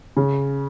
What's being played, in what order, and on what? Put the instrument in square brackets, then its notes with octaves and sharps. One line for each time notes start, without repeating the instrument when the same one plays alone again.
[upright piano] C#3